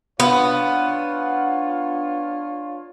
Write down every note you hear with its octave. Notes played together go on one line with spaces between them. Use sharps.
B3 D4 F4 C#5